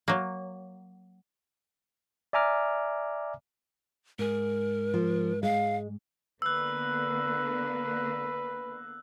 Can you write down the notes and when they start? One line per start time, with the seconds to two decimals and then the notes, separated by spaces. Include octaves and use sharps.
0.08 F#3 A#3
2.33 D5 E5 G#5 A#5 D6 F6
4.19 G#2 G#4 A#4
4.94 F3
5.43 G#3 F5
6.42 D3 A#3 B3 B4 E6 F#6